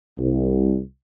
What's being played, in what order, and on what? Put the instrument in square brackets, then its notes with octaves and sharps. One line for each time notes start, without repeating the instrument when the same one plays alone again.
[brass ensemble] C2